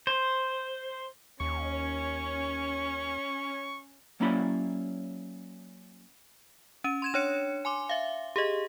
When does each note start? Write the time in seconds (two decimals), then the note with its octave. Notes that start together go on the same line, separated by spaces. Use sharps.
0.07 C5
1.40 D#2 C#4 C#6
4.20 F#3 A#3 C#4 E4 D5 B5
6.84 C#4 D#7
7.02 C6 G#6 E7
7.14 D4 C#5 C#7
7.65 G#5 C6 D6
7.89 E5 F5
8.36 G4 G#4 D#5